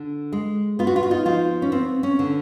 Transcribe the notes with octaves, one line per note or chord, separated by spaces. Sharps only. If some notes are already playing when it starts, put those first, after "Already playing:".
Already playing: D3
G#3
B3 F4
F#4
F4
F#4
D#4 F4
F3 D#4 F4
C#4
B3 C4
C#4
D3